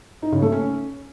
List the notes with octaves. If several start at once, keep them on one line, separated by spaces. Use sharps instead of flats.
D#4
C#3
A3
C#4